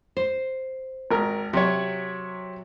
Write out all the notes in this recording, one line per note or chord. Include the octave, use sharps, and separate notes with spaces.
C5
G#1 A#4
C3 F#3 C#5